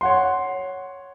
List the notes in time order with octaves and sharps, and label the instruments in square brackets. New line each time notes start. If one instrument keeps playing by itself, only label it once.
[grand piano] C#5 F#5 C6